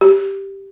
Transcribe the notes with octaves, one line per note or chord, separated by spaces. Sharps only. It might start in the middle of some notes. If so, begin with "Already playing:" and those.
G4